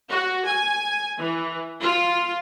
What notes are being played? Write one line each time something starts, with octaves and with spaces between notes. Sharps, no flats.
F#4
G#5
E3
F4